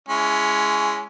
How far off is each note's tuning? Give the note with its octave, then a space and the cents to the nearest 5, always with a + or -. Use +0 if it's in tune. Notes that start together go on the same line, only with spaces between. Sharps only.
G#3 +0 C#4 +15 E4 +10